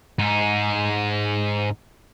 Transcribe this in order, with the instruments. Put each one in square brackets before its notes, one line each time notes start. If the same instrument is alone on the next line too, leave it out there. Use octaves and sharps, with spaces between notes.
[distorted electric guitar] G#2 D#4